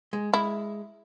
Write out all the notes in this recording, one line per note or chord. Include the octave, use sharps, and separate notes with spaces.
G#3
G#3 E4